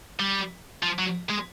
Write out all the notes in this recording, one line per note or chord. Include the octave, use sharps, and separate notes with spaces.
G3
F3
F#3
G#3